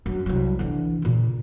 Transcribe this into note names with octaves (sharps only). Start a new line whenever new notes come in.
F#2
C2 F#3
D3 E3
A#2 C#3